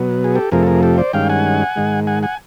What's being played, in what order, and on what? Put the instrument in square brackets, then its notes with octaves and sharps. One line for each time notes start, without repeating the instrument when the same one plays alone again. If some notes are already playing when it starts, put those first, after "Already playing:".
Already playing: [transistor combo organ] B2 F#3 B3
G#4
G4 A4
F2 C3 F3 A3 G#4 A#4
A4
G#4 A#4
G4 A4
C5 D5
G2 D#3 G#3 C#4 F5 G5
F#5 G#5
G#2 D#3 G#3
F#5 G#5
F#5 G#5